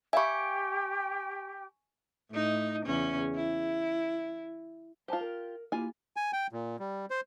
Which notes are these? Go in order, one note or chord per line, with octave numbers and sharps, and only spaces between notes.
G4 E5 F5 G5 G#5 B5 C#6
A2 D#4
E2 C#3 C#4
E4
F4 G4 C5 G#5 A5
A#4
A#3 E4 F4 G4 G#5
G#5
G5
A#2
G3
C5